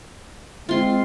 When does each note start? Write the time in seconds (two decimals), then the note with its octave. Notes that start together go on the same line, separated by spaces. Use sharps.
0.69 G#3 C4 F4 C6